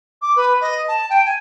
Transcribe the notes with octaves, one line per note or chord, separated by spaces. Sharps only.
D6
B4
D#5
A5
G5
G#5